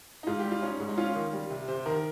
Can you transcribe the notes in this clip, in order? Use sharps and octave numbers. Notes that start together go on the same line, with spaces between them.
D#4
G#2 F4
G4
G3
F4
C#4 D#4
G#2
D#4
C#4 F4
D#3
G3
C3
C3 C5
D#3 A#4